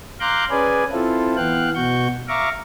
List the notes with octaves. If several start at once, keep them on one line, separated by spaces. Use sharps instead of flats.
F5 A#5 C6 D6 F#6 G6
C#4 G#4 B4 D5 G#5
C4 E4 F4 A4
E3 B3 F5 G5 F#6
B2 F#4 C#6 G6
E5 F5 A#5 C#6 D6